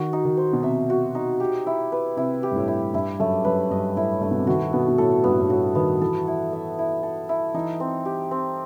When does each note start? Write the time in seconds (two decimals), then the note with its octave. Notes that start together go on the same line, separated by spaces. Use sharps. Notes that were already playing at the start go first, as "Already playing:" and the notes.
Already playing: D#3 F#4
0.13 D#4
0.25 D#3
0.37 C5
0.53 B2
0.63 C3 E5
0.90 F#4
1.15 D#4
1.40 G4
1.67 E4
1.92 B4
2.17 C3 E4
2.43 G4
2.52 G2
2.56 A2
2.68 E4
2.94 G2 E4
3.20 F#2 A3
3.45 F#2 B4
3.71 G2 D#5
3.96 A2 E4
4.22 G2 A3
4.31 B2
4.39 C3
4.47 D#3 F#4
4.73 B2 B3
4.88 B2
4.98 A2 A4
5.24 G2 B3
5.32 A2
5.40 G2
5.50 A2 F#4
5.75 D#3 B3
6.01 E3 A4
6.27 E4
6.53 E5
6.79 E4
7.03 A4
7.29 E4
7.54 E3 D#4
7.80 C4
8.05 G4
8.31 C4